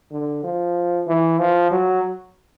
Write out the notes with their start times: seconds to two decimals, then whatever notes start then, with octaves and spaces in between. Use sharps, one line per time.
0.11 D3
0.44 F3
1.08 E3
1.39 F3
1.72 F#3